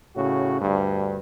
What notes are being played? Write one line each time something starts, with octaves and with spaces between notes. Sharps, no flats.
A2 C#3 F#4
D2 G2